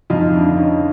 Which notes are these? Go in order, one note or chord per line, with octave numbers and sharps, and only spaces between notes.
F2 D#4 F4
D4 E4
D3
C#4 D#4